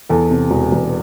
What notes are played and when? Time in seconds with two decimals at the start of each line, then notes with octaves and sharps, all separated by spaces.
0.09 E2 A4
0.30 C3
0.51 E1
0.72 E1